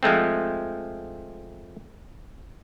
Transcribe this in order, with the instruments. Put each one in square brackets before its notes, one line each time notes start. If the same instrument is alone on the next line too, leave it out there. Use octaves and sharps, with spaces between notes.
[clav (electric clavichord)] F3 G#3 A3 C4